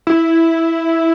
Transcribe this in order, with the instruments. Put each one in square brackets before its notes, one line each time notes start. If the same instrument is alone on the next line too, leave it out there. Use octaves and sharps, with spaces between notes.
[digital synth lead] E4